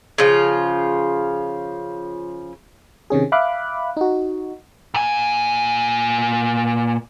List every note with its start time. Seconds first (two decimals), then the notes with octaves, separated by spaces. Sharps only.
0.18 C#3 F3 F4
3.10 C3 D#3 C#4 G#4
3.32 E5 F5 B5 D6 F#6
3.97 D#4 F#4
4.94 A#2 G#5